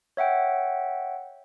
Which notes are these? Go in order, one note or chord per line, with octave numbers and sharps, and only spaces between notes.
C#5 E5 F#5 G5